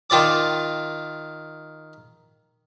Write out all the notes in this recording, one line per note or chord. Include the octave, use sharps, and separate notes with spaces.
D#3 F4 D5 D6